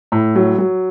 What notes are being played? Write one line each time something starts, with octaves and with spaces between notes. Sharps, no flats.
A2
F#3
F#3